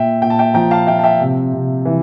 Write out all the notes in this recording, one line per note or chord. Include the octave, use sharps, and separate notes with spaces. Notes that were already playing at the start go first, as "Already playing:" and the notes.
Already playing: A#2 E5 G5
A#2 G5
A5
E5 G5
F3 G5 A#5
F5 A5
F3 E5 G5
A5
E5 G5
C3
C3
E3